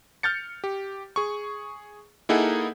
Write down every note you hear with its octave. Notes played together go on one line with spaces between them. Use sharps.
F6 G6 A6 C#7
G4
G#4 C#6
A#3 D#4 E4 G#4 A4 F#5